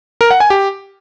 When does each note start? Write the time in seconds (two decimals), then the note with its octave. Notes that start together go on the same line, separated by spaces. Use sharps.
0.21 A#4
0.31 F#5
0.40 G#5
0.50 G4